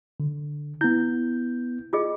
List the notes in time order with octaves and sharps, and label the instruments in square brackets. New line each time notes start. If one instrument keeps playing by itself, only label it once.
[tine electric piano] D3
[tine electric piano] B3 G6 [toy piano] E4
[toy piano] F4 G#4 D#5